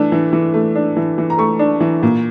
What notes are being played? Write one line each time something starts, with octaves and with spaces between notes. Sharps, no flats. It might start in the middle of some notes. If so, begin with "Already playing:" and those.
Already playing: E3 A3 D4
E3
E3
A3
D4
E3
E3
A#5
A3 C#6
D4
E3
A#2